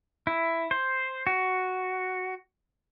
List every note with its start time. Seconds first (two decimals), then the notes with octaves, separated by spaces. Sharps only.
0.27 E4
0.71 C5
1.27 F#4